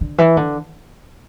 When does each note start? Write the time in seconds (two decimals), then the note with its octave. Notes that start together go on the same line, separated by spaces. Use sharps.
0.01 D3
0.18 E3
0.37 D3